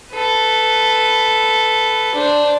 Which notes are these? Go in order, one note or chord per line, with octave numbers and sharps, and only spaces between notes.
A4 B4
D4 C5